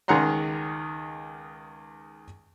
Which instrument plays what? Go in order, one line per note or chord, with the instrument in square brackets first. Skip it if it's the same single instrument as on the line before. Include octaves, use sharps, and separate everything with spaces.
[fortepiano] C#2 D#3 G#4 F#5 A#5 C6